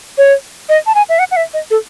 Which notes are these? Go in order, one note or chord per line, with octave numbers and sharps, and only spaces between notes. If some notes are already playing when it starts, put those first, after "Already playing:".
C#5
D#5
A5
G#5
E5
F#5
F#5
E5
D#5
A4